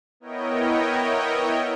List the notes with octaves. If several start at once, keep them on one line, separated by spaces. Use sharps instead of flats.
B3 E4 A#4 C#5 D#5 G5